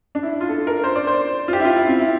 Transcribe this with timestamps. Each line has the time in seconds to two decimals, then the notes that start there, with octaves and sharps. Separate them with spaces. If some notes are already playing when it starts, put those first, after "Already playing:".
0.15 D4
0.23 E4
0.41 F4
0.49 A4
0.67 A#4
0.84 C5
0.96 D5
1.07 C5
1.48 F4
1.53 G4
1.60 E4
1.65 F4
1.77 E4
1.88 C4
1.99 E4